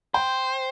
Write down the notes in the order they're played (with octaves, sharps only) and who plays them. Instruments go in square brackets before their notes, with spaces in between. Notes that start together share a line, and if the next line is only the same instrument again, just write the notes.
[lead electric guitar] C5 [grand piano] G5